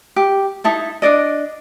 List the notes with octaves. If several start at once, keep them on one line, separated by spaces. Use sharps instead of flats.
G4
D#4 E4 A4 E5
D4 D#4 D5 D#5